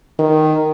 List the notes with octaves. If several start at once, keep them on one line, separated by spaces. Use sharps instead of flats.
D#3